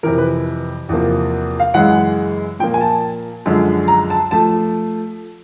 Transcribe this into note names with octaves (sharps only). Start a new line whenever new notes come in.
F2 C3 E3 A#4
B4
E2 C3 F3 A#3
F5
F#2 C#3 E3 G#3 F#5
A#2 F3 A#3 G5
G#5
A5
F#2 D3 F3 G#3
A#5
A5
F3 A3 A5